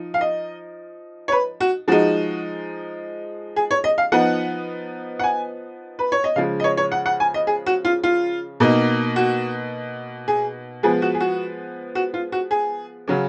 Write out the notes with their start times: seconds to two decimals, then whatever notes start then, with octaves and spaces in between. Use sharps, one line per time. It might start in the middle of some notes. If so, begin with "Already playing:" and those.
Already playing: F3 D#4
0.14 F5
0.21 D#5
1.28 C#5
1.32 B4
1.60 F#4
1.88 F3 G#3 D#4 F#4
3.56 G#4
3.71 C#5
3.84 D#5
3.98 F5
4.12 F3 B3 D#4 F#5
5.19 F#5
5.24 G#5
5.99 B4
6.12 C#5
6.24 D#5
6.36 C#3 F3 G#3 F5
6.60 D#5
6.64 C#5
6.77 C#5
6.92 F#5
7.06 F#5
7.20 G#5
7.34 D#5
7.47 G#4
7.66 F#4
7.85 F4
8.03 F4
8.60 B2 A#3 D#4
9.16 F#4
10.28 G#4
10.83 F3 G#3 B3 G#4
11.02 F#4
11.14 G#4
11.20 F#4
11.95 F#4
12.14 F4
12.32 F#4
12.51 G#4
13.08 C#3 F#3 C#4